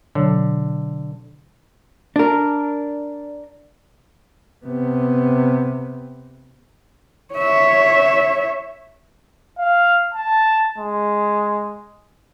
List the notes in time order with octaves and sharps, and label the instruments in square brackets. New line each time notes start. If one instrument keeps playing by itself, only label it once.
[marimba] B2 F#3 C#5 [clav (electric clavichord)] D3
[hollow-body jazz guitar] D4 A#4
[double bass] C3 B3
[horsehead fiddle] C#5 E5
[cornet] F5
A5
G#3